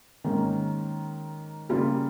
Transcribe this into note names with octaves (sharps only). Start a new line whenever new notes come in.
G#2 D#3 A#3 C#4
C#3 G3 A#3 F4